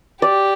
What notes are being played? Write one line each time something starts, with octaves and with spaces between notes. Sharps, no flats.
G4 D5